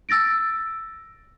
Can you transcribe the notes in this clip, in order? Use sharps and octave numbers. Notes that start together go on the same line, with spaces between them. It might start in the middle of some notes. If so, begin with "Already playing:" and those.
E6 A6 A#6 D7